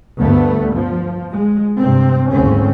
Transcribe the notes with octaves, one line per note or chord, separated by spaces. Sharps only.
D2 G2 A3 B3
F3
G#3
G2 C3 C4
F#1 D2 G#2 C#3 C4 C#4